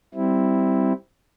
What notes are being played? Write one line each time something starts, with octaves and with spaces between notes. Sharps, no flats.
G3 C4 E4